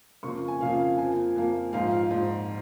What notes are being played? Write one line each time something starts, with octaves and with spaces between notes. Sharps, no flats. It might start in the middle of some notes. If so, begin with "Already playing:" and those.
F2 C#3 A#3 C#6
G#5
F2 C#3 A#3 F5
F5
F2 F3 A#3 G#5
F2 F3 A#3
A#1 G#2 F3 F5
F5
A#1 G#2 F3